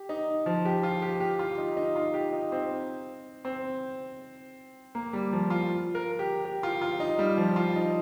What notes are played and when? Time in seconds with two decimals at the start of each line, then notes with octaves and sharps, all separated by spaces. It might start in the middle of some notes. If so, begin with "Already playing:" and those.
Already playing: G4
0.09 D#4
0.46 F3
0.65 G4
0.83 F4
1.02 G4
1.20 G4
1.39 F4
1.58 D#4
1.77 D#4
1.96 F4
2.14 G4
2.33 D#4
2.52 C4
3.45 C4
4.95 A#3
5.13 G3
5.32 F3
5.50 F4
5.95 A#4
6.19 G4
6.45 G4
6.63 F4
6.82 F4
7.00 D#4
7.19 G3
7.37 F3
7.56 F4
7.76 D#4